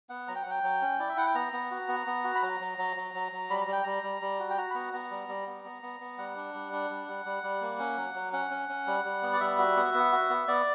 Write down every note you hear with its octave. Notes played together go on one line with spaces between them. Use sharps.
B3 F#5
F#3 A#5
G5
F#5
F#3 G5
F#3
C#4
E4 D5
E5
E4 F#5
G5
B3 A#5
B3
F#4
B3
B3
F#4
B5
F#3 A#5
F#3
F#3
F#3
F#3
F#3
G3 B5
A#5
G3 G5
G3 A#5
G3
G3
F#4
G5
F#4 A#5
B5
B3 A#5
B3 A#5
G3
G3
B3
B3
B3
B3
G3 F#5
D4
G3
D4
G3
G3
G3
G3
A#3
C#4
F#3
F#3
C#4 F#5
C#4
C#4
G3
G3
B3
D5
G3 E5
F#4
B3
B3
F#4
B3
B3 D5